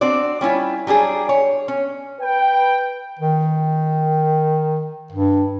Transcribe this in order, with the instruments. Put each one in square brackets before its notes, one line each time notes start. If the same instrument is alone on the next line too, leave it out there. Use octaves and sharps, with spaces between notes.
[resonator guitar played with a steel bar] C4 D4 F#4 D5
G3 C#4 E4 F4
F#3 G3 D4 G#4
C#5
C#4
[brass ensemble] B4 G5
[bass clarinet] D#3
G2